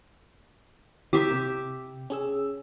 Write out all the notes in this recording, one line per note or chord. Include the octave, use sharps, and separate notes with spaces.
G4 E5 A#5 C6 D#6
C3
C#4 G#4 E6